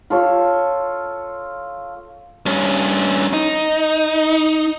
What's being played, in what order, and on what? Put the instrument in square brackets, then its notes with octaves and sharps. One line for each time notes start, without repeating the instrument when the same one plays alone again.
[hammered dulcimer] F4 A4 C#5
[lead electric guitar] G2 C#4
D#4